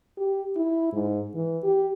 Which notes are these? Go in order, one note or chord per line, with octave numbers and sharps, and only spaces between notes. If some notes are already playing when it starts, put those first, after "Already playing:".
G4
E4
G#2
E3
G4